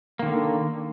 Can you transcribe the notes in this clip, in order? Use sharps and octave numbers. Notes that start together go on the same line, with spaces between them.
D3 D#3 A#3